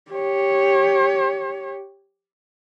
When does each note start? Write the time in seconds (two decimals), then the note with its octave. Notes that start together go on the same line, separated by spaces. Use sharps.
0.12 G4 C#5